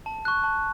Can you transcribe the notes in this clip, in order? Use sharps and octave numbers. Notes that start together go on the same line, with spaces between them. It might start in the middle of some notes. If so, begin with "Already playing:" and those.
A5
C#6 F#6
A5